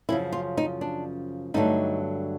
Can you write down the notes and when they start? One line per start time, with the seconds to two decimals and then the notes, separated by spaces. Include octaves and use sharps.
0.09 F#2 C#3 F3 E4
0.32 F4
0.57 D#4
0.81 D4
1.54 G2 D3 F#3 A3 D#4